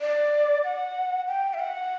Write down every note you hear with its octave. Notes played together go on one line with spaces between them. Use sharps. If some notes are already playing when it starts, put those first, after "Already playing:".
D5
F#5
G5
E5
F#5